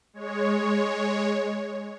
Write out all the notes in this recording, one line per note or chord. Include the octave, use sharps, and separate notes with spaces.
G#3 C#5